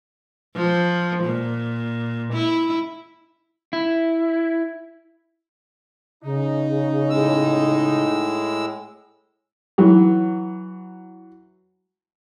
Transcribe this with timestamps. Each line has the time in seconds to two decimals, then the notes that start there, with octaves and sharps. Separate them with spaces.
0.56 F3
1.24 A#2
2.33 E4
3.73 E4
6.24 C#3 D#4
7.10 A2 G#3 E6
9.78 E3 F#3